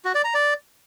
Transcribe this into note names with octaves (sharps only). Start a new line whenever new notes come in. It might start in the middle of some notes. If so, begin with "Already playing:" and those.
F#4
D5
A#5
D5